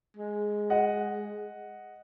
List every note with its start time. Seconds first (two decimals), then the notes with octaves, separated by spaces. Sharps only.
0.17 G#3
0.70 D#5 F#5